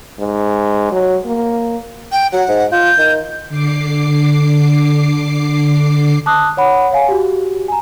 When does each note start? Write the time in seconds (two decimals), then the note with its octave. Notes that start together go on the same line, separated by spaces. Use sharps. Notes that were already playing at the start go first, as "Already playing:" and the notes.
0.20 G#2
0.92 F#3
1.26 A#3
2.12 G5
2.33 F#3 F#5
2.48 G#2
2.72 F4 G6
2.98 D#3
3.49 D3 D6 C7
6.26 A5 D6 D#6 F#6
6.57 C#5 F#5 B5
6.91 C#5 F5 G#5
7.08 F#4 G4
7.68 G#5 A#5